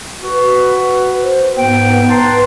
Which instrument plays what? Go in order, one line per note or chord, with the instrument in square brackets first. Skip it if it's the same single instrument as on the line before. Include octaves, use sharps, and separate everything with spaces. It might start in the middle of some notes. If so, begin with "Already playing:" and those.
[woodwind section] F#4 B4
[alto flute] C5
[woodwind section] G#2 G5 [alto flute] B3
[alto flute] B4 [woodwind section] A5 A#5 C6